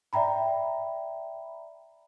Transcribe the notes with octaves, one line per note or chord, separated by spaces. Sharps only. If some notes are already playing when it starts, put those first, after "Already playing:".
D5 E5 G5 A#5 B5